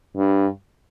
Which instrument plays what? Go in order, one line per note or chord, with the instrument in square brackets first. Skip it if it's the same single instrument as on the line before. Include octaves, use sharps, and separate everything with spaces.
[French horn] G2